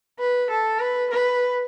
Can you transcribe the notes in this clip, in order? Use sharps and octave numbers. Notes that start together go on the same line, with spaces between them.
B4
A4
B4
B4